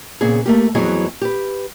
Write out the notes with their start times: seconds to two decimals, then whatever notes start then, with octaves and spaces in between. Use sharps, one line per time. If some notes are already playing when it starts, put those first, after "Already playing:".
0.21 A#2 C#3 B3 C4 G#4
0.46 A3 A#3 G4
0.75 F2 E3 F#3 B3 E4 G#4
1.21 G4 B4